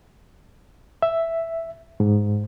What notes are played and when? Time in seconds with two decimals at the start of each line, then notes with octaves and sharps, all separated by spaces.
1.02 E5
2.00 G#2